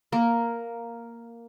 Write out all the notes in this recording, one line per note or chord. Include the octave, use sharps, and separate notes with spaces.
A#3 A#4